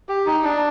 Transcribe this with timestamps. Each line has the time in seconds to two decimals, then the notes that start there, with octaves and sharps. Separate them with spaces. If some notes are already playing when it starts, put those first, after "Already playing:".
0.09 G4
0.26 D#4
0.43 D4